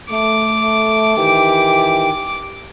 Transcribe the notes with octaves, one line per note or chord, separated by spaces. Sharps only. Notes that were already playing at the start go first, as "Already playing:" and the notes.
A3 D6
D#3 E3 G4